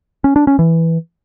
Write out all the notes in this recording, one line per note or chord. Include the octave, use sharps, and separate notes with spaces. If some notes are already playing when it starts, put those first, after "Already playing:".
C#4
D4
C#4
E3